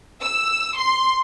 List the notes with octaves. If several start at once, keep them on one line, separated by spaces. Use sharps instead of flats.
E6
C6